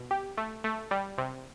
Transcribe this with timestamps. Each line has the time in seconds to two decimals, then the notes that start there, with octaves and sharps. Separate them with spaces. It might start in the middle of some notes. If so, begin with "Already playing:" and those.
Already playing: B2
0.11 G4
0.37 A3
0.64 A3
0.91 G3
1.18 C3